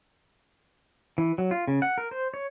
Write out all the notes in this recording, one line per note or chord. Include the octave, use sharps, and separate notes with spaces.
E3
F#3
F4
C#3
F#5
A#4
C5
C#5